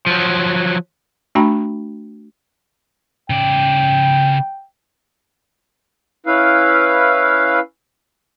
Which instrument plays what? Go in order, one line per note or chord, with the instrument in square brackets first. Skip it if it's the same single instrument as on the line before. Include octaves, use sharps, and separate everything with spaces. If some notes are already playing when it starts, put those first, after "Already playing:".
[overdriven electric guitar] F3 F#3
[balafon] A3 D4 F#4 G5 A#5 B5
[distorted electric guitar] C#3 D5 [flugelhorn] G5
[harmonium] C#4 E4 B4 F5